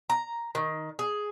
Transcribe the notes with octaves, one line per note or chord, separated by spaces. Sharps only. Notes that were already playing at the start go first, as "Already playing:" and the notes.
A#5
D#3
G#4